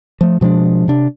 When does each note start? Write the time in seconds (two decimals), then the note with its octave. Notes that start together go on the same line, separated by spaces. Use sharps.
0.21 F3 A3
0.41 B2 F3 G#3 D4
0.88 C3 D4